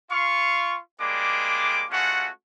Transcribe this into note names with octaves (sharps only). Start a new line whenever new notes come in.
F4 F5 C#6
G3 G#3 A#3 D4 D6
G#3 A3 C#4 F4 F#4 F#5